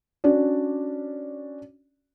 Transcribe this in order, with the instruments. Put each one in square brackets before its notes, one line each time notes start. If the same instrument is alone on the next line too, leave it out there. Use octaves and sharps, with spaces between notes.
[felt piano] C#4 D4 F#4 D5